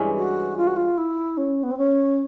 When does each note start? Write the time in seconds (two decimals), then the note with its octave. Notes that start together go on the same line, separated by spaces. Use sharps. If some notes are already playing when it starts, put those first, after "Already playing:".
Already playing: G2 E3 G#3 C#4
0.17 F#4
0.57 F4
0.67 F#4
0.76 F4
0.97 E4
1.37 C#4
1.63 B3
1.71 C4
1.78 C#4